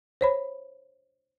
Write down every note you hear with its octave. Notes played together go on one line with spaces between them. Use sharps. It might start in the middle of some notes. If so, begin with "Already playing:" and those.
C5 C#5 B5